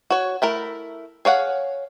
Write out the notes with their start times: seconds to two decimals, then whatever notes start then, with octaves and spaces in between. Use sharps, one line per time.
0.10 F#4 C#5
0.42 A3 E4 A#4
1.25 G#4 C#5 F5 F#5